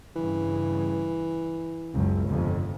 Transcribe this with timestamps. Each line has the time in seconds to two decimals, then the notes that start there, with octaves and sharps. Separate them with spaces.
0.16 G2 C#3 E3
1.93 F#1 C#2
2.28 G1 F2 C3